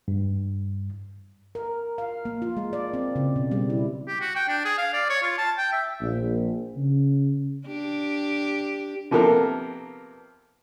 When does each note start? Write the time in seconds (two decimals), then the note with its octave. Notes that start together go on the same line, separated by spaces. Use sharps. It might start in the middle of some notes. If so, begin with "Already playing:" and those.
0.08 G2
1.55 A#4
1.98 F5
2.25 A#3
2.42 F4
2.57 G#3
2.73 D5
2.93 C4
3.16 C#3
3.36 B2
3.51 G3
3.70 E4
4.08 G4
4.21 F#4
4.35 G5
4.48 D4
4.65 G#4
4.78 F5
4.93 D5
5.09 C#5
5.23 F4
5.38 A5
5.57 G5
5.73 E5
6.02 A#1
6.76 C#3
7.67 D4 G4
9.11 C3 F3 A#3 B3 A4 A#4